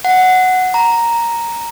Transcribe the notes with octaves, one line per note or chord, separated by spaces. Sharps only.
F#5
A#5